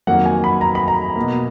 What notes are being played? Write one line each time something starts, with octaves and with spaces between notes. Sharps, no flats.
F2 D#3 F#3 A#3 F#5
G#5
B5
A#5
B5
A#5
B2 A#3